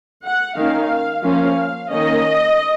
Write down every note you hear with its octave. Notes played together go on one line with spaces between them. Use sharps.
F#5
D#3 A#3 C#4 F5
F3 A#3 C#4 F5
D#3 A#3 C#4 D#5